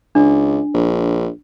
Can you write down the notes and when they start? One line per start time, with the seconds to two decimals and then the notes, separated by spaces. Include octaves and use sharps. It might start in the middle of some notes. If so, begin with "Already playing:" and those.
0.15 C#2 D4
0.74 A#1